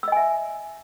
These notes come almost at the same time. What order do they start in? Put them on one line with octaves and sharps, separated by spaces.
E6 D#5 G#5 E5